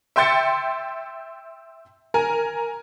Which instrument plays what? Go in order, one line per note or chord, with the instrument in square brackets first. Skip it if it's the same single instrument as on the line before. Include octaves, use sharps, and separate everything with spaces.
[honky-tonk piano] E5 G5 C6 G6 A6 C#7
A#4 G#5 A#5